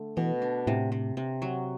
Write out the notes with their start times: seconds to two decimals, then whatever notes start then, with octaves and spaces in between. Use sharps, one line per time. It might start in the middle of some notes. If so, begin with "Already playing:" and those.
Already playing: D3 A3
0.17 B2 E3
0.42 D4
0.67 A2 C3
0.92 C3
1.17 C3
1.42 F#3